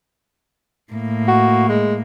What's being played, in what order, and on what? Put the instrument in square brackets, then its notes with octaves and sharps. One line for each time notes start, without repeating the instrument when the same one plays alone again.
[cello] A2 A#3
[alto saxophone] F#4
G#3